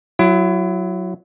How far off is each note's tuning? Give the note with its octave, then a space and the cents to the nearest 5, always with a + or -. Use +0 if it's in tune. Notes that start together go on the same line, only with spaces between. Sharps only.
F#3 +0 E4 +30